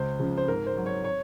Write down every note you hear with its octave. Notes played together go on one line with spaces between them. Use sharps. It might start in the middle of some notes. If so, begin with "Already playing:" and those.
Already playing: C#2 C5
C#3 F3
C5
G#2 A#4
C5
F#3
C#5
C#5